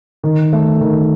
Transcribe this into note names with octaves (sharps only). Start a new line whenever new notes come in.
D#3
A3
D#3